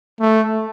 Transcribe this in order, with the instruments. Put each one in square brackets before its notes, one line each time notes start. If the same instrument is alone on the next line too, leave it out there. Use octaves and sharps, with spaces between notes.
[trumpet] A3